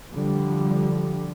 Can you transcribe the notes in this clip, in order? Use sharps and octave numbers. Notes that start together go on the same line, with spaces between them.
D3 F3 G3